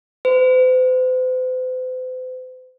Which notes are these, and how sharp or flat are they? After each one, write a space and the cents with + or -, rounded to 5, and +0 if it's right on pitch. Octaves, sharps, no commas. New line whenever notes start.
C5 -45